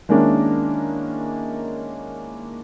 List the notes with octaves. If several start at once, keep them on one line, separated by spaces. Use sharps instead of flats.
D#3 G#3 A#3 C#4 D4 E4